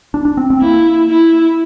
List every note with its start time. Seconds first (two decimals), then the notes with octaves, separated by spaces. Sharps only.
0.14 D4
0.25 D4
0.37 C4
0.50 C4
0.62 A#3 E4
1.10 E4